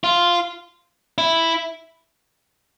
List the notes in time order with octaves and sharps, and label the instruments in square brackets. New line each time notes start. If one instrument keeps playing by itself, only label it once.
[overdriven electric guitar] F4
E4